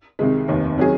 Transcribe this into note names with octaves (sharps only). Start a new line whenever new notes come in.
C2 C3 D#3 G#3
F1 D#2 D#3
C3 D#3 F#3 C#4 G#4